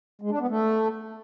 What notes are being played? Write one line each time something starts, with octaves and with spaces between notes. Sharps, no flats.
G#3
D4
B3
A3